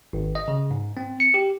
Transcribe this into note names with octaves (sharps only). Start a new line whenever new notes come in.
G#1
D#5
C#3
G#2
C4
C#7
G4